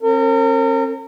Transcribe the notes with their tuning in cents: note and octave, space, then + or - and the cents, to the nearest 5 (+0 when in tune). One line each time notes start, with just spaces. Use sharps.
C4 +45 A#4 -40